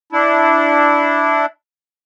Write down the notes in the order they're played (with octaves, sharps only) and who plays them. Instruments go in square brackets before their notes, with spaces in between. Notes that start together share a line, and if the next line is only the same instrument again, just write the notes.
[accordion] D4 E4